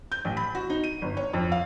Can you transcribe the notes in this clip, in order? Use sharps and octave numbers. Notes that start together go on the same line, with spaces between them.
G6
A1
B5
F#4
D#4
D#7
G1
C#5
F2
F5